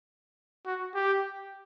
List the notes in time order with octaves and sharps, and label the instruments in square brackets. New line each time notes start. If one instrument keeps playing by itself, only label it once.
[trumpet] F#4
G4